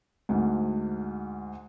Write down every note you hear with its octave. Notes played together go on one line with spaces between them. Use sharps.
D2 G#2